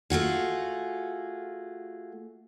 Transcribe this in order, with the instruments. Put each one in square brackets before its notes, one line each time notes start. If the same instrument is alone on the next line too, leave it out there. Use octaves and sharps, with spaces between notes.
[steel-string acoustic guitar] A3 F4 F#4 G#4